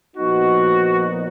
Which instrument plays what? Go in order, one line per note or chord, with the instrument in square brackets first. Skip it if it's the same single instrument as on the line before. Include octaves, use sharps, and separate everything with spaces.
[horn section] A#2 F3 B3 D#4 F#4